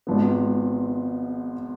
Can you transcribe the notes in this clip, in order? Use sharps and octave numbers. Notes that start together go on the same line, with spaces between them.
G#1 G#2 F3 B3